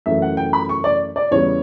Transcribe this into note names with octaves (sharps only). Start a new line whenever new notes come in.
F#2 E3 A3 E5
F#5
G5
B5
C#6
D5
D5
E2 C#3 G3 C#5